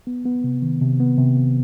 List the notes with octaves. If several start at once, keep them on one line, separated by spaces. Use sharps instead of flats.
B3
B3
C3
D#3
C3
B3
C3
C3